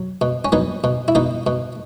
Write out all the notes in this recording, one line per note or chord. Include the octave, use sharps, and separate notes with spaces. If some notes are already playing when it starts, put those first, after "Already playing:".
Already playing: F#3
B2
C#4
F#3 B3 D#4
B2
E4
B2 B3 D#4
B2